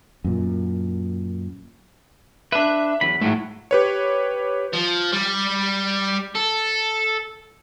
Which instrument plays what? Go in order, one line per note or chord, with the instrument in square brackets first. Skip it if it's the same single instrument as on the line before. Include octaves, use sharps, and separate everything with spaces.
[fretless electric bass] F#2 A#2
[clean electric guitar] D4 B4 [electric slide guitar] E5
[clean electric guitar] E2 F#3 B5
[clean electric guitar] G#2 F#3 [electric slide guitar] A3 E4
[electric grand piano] G4 B4 C#5
[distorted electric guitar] F3
G3
A4